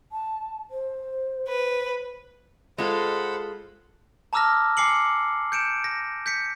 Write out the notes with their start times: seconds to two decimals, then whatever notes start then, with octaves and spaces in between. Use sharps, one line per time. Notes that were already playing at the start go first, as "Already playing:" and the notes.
0.12 A5
0.71 C5
1.49 B4
2.78 G#3 F4 A4 C5 F#5 B5
4.33 A5 A#5 D6 E6 F6 A#6
4.77 G#5 D6 C7 C#7 F#7
5.52 G6 C#7 D7 E7
5.84 A#6
6.26 G6 B6 C#7